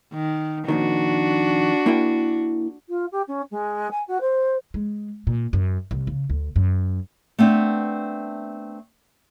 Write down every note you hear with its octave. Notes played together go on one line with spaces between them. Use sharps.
D#3
F2 A#2 D#3 D4 F#4
A#3 E4 G5
F4
G4
C#4
G#3
G#5
F#4
C5
G#3
A#2
F#2
C2
C#3
D2
F#2
A3 B3 C4 D4